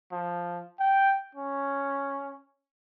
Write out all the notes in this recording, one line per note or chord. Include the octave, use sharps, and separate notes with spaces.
F3
G5
C#4